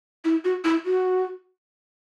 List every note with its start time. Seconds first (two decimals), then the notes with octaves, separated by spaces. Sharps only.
0.25 E4
0.44 F#4
0.65 E4
0.86 F#4